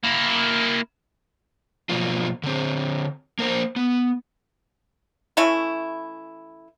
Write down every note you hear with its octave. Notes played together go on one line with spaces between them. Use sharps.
A#3 E4
B2 F3 F#3 A#3 F4
D3 C4
A#3 A#4 C5
B3
E3 A3 C#4 E4